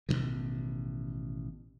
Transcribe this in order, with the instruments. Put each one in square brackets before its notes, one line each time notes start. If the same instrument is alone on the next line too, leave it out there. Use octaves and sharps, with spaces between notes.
[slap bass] A1 B2 D3 D#3